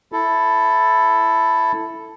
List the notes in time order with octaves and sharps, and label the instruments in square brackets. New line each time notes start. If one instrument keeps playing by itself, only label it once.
[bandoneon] E4 A4